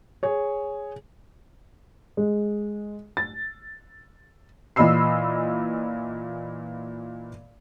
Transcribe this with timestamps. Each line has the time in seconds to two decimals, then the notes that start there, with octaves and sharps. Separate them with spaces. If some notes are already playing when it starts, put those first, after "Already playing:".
0.23 G#4 C#5
2.17 G#3
3.17 A6
4.76 A#2 E3 D#5 B5 E6 C7